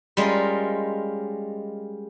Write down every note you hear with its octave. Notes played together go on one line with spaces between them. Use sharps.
G3 G#3 C#4 F4 A#4